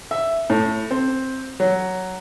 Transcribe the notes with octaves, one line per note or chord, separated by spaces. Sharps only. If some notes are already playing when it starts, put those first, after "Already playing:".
E5
A2
C4
F#3